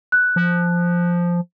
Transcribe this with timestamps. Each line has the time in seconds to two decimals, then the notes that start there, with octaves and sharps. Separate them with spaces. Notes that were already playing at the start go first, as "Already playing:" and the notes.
0.12 F#6
0.36 F3